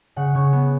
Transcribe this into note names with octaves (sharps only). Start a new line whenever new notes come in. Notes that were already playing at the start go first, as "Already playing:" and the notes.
C#3 F#5
C#3 C#5
B3